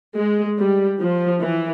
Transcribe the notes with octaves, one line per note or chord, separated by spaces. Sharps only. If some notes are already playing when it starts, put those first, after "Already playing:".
G#3
G3
F3
E3